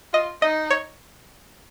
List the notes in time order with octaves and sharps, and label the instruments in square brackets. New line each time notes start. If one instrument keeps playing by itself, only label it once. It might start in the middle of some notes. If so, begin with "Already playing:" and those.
[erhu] F4 [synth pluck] D#5
[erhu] D#4 [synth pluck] D#5
[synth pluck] C#5